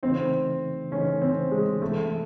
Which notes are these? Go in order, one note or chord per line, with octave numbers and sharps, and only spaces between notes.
C#3 E3 A3 C4 D#4
C#3 E3 A3 C#4 D#4
C4
G#3
C3 E3 G#3 A3